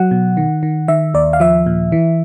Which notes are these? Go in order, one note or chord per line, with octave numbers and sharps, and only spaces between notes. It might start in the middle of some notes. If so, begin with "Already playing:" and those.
Already playing: F#3 F#5
B2
D#3
D#3
D#3 E5
D#2 D5
F5
F3 E5
A#2
E3